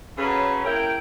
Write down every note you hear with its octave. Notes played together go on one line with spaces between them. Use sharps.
C#3 F#3 C#4 A4 B4
C#3 A#3 E4 A#4 G5